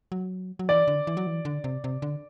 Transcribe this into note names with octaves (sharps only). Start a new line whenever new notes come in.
F#3
F#3
E3 D5
D3
E3
F#3
E3
D3
C3
C3
D3